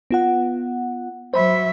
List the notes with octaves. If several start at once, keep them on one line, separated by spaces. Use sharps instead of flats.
B3 F4 F#5
F#3 C5 E5 B5